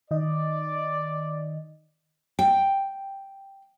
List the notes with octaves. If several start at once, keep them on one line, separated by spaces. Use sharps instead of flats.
D#3 D5 D#5
G5